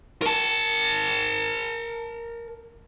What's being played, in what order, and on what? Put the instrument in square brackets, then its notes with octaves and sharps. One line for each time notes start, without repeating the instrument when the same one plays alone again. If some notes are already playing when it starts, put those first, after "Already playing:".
[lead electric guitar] A#4 A5